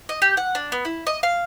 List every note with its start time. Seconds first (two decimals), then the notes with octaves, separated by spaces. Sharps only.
0.09 D#5
0.22 G4
0.37 F#5
0.55 D4
0.72 B3
0.85 E4
1.07 D#5
1.23 F5